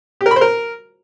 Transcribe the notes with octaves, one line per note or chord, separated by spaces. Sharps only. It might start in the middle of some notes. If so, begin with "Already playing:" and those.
G4
A#4
B5
C5
A#4